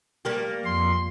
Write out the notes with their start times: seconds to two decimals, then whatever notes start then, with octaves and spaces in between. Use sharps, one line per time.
0.25 G3 A#3 G4
0.65 F2 C6